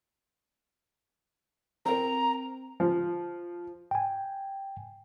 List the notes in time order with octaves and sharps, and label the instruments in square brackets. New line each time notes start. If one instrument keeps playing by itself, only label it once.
[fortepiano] C4 A#4 [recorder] A#5
[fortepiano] F3
[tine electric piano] G5 G#5